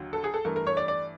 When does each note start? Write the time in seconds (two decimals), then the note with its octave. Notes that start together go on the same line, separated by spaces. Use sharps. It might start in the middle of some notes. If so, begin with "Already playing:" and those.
Already playing: D#2 D3 F#3
0.13 A4
0.24 G#4
0.34 A4
0.45 G2 E3 A3 A#4
0.56 A#4
0.67 C#5
0.77 D5
0.88 D5